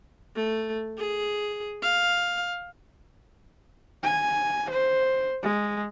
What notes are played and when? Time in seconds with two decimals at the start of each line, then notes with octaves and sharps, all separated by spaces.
0.35 A3
0.98 G#4
1.82 F5
4.03 G#5
4.70 C5
5.43 G#3